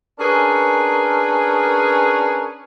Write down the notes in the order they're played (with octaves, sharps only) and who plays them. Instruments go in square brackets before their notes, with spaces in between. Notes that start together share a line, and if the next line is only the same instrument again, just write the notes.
[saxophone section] C#4 D4 G#4 A#4 B4